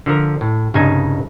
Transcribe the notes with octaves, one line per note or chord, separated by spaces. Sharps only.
D3 F3 D4 A#4
A2
C2 G2 C#3 G#3 D#4 G#5